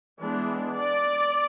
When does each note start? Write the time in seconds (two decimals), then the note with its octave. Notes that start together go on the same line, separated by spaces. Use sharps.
0.19 E3 G#3 B3 D4
0.77 D5